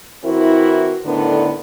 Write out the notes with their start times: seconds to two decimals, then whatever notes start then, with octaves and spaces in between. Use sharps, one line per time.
0.24 E3 C4 E4 F#4 A#4
1.06 A2 D3 D#3 B3 D4